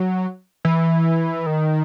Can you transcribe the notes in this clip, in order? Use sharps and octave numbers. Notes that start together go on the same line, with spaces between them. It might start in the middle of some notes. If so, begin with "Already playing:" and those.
Already playing: F#3
E3
D#3